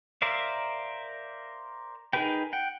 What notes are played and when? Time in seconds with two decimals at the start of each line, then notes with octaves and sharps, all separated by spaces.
0.22 A#4 C5 D5 E5 F5
2.13 D#4 G#4 A#4 B4 G5
2.53 F#5 G5